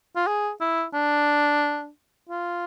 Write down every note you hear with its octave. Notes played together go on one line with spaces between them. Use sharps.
F4
G#4
E4
D4
F4